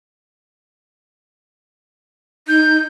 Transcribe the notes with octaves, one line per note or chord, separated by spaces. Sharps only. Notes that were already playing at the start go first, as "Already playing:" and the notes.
D#4 G6